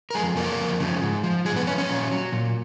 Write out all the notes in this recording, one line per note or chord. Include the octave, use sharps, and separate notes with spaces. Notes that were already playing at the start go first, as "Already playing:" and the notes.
A#4
F2 G#3 G#4
C#3 F3 A#3 A#4
F2
C#3 F3
G#2
F3
G#2 G#3 G#4
B3 B4
F3 C#4 C#5
C#4 C#5
A#2
F#3
A#2